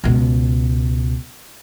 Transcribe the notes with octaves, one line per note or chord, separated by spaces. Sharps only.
C#2 B2